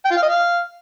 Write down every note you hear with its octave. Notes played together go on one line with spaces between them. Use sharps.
G5
F4
F5
D#5
F5